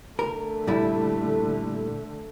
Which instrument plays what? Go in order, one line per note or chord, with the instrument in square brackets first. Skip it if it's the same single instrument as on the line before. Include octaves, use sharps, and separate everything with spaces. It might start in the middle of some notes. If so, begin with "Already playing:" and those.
[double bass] D3 A3 [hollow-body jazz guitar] A#4
[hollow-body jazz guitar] A#2 G3 E4